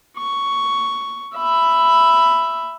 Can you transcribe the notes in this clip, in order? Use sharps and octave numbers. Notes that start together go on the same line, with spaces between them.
C#6
E5 B5